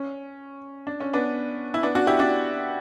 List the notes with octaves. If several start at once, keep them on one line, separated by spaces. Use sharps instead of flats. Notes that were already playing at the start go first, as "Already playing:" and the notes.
Already playing: C#4
D4
C#4
B3 D4
E4
B3 D4
D4 F#4
E4 G4
D4 F#4